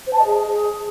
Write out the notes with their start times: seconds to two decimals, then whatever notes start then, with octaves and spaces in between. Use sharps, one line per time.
0.07 C5
0.13 A5
0.19 D#5
0.25 G#4